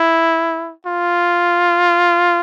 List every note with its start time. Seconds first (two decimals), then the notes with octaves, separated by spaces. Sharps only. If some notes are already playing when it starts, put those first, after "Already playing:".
Already playing: E4
0.87 F4